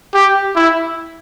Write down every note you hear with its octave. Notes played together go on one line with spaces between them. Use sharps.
G4
E4